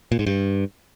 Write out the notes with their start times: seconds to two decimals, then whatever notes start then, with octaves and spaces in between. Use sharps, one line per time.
0.12 A#2
0.19 G#2
0.27 G2